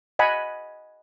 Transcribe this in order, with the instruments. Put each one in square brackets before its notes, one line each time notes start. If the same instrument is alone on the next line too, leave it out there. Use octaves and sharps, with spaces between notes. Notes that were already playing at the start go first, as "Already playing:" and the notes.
[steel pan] D#5 F#5 G#5 B5